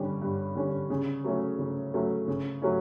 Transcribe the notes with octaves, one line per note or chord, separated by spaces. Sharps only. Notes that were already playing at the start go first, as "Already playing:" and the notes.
Already playing: G2 D3 G3 C#4
G2
D3 G3 C#4
C#3
F#3 A3 C#4
C#3
F#3 A3 C#4
C#3
F#3 A3 C#4